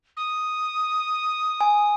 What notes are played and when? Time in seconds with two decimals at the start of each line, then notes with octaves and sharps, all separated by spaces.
0.17 D#6
1.61 G#5